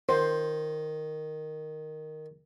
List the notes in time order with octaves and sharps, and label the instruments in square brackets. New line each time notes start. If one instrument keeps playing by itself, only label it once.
[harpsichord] D#3 [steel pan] C5